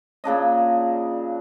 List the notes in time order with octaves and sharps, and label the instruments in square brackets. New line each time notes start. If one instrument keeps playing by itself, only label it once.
[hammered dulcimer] A#2 C#3 D4 D#5